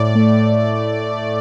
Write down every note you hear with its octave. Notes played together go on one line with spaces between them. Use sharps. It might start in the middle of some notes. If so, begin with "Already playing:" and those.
Already playing: A2 D5
A3
A2